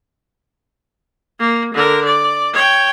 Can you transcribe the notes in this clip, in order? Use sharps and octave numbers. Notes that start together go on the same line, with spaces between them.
A#3
D3 A#4
D5
C#5 G5